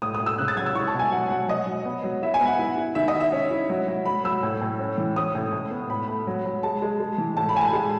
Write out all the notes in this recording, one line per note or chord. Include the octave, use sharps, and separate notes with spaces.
A2 D#6
D#6
A2
E6
C#3 F#6
A6
F#3 G#6
E6
E4 C#6
A5
B2
G#5
F#3 F#5
F#3 F#5
F#3 D#5
F#3
B3
F#3
E4 E5
G#5
B3
F#5
E4
E4
D#3 E5
D#5
D#3
E5
C#4
E4
F#3
F#3
F#3 B5
F#3 E6
A2
A2
C#4
E3
C#4 D#6
A2
A2
B3
A2 B5
A3
F#3
F#3
G#3 A5
G#3
G#3
E3
A2 A5
B5
A2 G#5
A5
G#3